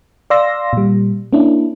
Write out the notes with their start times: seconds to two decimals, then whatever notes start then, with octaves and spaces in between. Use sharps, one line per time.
0.30 D5 F5 C6 E6 A#6
0.73 A#2 G3
1.33 A#3 C#4 D4 E4